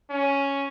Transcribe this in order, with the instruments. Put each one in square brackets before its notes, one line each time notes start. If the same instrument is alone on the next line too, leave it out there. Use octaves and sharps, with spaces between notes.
[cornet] C#4